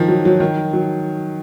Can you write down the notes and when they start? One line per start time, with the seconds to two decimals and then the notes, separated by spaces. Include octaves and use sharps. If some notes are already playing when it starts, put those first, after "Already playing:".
Already playing: D#3 F3
0.08 F#3
0.25 F#3
0.40 D#3
0.73 F#3